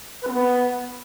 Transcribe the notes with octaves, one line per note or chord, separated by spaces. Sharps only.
B4
C4
B3